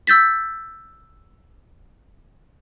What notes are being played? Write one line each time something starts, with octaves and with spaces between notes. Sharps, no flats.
E6 G6 A6 B6